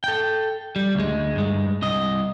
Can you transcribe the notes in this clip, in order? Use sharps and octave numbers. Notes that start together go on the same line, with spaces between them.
A4 G5
G3
D2 G#3
G2 G#3
C2 D#5